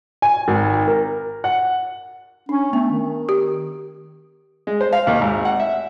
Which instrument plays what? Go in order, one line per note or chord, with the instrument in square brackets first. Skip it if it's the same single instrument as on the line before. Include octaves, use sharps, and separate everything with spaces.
[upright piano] G#5
G#1
A#4
F#5
[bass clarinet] C#4 [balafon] D4
[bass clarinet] A3 [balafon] B3
[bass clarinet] D#3
[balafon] G4
[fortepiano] G#3
C5
F5
D#2
G#1
F#5
E5